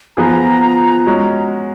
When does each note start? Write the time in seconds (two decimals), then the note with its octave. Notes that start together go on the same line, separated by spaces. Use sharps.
0.16 F3 B3 F4 G#4 A#5
1.06 G#3 C#4 F#4